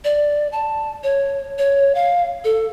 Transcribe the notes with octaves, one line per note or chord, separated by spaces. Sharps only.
D5
A5
C#5
C#5
F5
A4